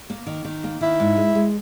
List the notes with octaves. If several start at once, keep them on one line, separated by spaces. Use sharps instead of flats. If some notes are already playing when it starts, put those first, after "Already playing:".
A#3
D#3
D#3
A#3
D#3 E4
G#2
G#3
G#3